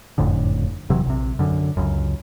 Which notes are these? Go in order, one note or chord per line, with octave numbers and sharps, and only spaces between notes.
F#1 F2 A2 D3
E1 C3 E3 F#3
A#1 C3
F#2 D3
C#2 F#2